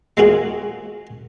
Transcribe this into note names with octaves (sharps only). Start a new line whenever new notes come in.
G#3 A#3 C4 F4 F#4 G#4